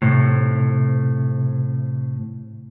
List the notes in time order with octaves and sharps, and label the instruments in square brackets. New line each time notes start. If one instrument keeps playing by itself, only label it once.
[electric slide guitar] A2 C3